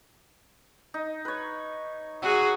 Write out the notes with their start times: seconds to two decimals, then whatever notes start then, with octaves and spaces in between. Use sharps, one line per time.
0.94 D#4
1.25 B4 C#5
2.22 F#3 F#4 G#4